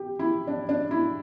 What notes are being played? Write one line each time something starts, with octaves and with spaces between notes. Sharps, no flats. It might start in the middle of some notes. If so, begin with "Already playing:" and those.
Already playing: G4
E4
D4
D4
E4